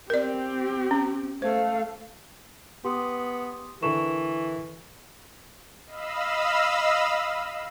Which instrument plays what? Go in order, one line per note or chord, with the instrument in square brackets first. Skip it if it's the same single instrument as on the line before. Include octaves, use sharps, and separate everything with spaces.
[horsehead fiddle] C4 G4 [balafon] A#4 D5
[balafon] C#4
[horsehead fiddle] A3 F5 [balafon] C5
[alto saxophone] B3 [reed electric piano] G4 [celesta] C6 D6 D#6
[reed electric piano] D3 A4 A#4 [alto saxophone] E3 [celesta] C#6 E7
[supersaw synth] D#5 F5 B5 E6